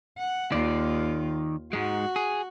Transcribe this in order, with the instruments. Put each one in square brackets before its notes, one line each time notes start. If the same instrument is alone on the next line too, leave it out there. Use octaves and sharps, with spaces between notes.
[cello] F#5
[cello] D#2 F4 [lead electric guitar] D#3 D5
[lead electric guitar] G#2 G#3 [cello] F#4
[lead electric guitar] G#4